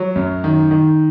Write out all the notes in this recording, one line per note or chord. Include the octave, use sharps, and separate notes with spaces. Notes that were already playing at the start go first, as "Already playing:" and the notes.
Already playing: F#3
F#2
D#3
D#3